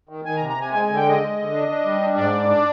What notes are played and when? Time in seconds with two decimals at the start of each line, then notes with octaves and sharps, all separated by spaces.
0.09 D#3
0.25 D#3 G#5
0.37 A#5
0.41 C3
0.49 A#5
0.58 C3 G#5
0.73 G#3 G#5
0.85 D3 G#5
0.97 G5
1.05 G#3 D#5
1.21 G#3
1.37 D3
1.53 D4
1.69 D4
1.85 G3
2.01 D4
2.17 G#2 D5
2.33 D4
2.49 D4